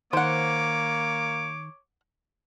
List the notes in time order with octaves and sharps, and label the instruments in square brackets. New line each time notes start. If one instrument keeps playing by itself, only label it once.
[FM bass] D#3 [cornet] A#3 [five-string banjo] C5 F#5 [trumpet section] C#5 D6